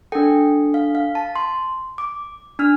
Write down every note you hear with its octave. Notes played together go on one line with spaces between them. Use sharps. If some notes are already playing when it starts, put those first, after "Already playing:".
D4 A4 G5
F5
F5
A5
C6
D6
D4 F6